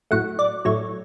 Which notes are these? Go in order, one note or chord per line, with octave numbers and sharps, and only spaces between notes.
A2 F#3 A3 F#5
D5
A2 F#3 A3 C#5